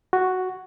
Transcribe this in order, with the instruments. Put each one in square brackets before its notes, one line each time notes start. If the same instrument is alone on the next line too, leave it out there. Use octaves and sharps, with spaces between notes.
[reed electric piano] F#4